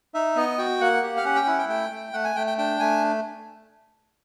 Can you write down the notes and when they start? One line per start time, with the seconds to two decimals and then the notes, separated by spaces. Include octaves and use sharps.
0.14 D#4 E5
0.36 B3 D#5
0.58 F#4 G5
0.81 A#3 F#5
1.03 G4
1.17 F5
1.25 C#4 F#5
1.36 G5
1.47 E4 F#5
1.58 G5
1.69 A3 G5
1.91 A3
2.13 A3 F#5
2.25 G#5
2.36 A3 G5
2.47 G5
2.58 D4 G5
2.80 A3 G#5